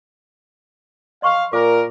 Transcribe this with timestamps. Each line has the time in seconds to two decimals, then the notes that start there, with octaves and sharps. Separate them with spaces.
1.22 D#5 F5 C6 C#6
1.53 A#2 A#4 D6